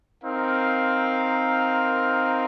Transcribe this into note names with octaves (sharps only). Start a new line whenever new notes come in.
C4 D#4 A#4 F5